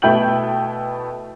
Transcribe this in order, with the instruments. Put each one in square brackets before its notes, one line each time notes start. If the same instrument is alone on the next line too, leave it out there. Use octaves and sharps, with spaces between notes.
[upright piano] B2 A3 E4 G5 G6 F#7